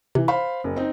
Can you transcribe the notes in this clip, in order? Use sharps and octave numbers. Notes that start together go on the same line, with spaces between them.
C3 E3
C5 F5 B5 C#6
F#1
C4 D#4